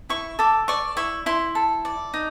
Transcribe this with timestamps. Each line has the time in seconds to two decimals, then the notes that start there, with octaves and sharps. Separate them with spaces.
0.09 E4 C#6
0.39 A4 D6
0.68 D5 C#6
0.97 E4 C#6
1.26 E4 C6
1.55 A4
1.85 D5
2.14 D#4